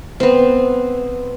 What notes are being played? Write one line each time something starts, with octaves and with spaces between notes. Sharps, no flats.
B3 C4